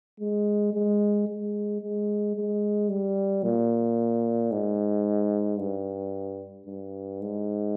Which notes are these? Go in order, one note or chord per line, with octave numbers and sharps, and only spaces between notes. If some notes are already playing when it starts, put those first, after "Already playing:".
G#3
G#3
G#3
G#3
G#3
G3
A#2
G#2
G2
G2
G#2